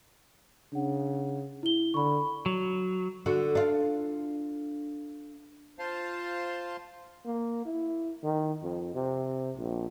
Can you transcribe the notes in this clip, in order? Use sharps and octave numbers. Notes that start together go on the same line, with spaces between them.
C#3 D4 F#5
E4 G7
D3 B5 C#6
F#3
D3 F#4
D4 F4
F4 C5 F5 A5 C6
A#3
E4
D#3
F2
C3
A#1